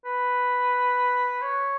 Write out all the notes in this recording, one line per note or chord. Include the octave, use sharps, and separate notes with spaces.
B4
C#5